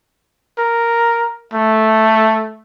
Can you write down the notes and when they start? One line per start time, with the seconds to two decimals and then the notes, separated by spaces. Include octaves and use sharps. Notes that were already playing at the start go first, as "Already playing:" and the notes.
0.58 A#4
1.53 A3